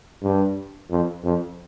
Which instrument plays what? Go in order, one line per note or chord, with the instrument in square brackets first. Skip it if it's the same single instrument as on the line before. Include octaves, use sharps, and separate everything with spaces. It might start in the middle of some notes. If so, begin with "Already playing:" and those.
[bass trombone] G2
F2
F2